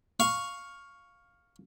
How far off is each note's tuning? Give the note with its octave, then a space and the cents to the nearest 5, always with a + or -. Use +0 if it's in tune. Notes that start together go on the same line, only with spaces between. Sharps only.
F5 +10 C#6 +0